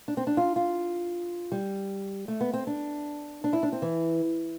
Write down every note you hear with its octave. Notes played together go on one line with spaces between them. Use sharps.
D4
C4
D4
F4
F4
G3
A3
B3
C4
D4
D4
E4
D4
C4
E3